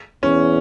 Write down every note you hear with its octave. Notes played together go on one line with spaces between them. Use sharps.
E2 C#4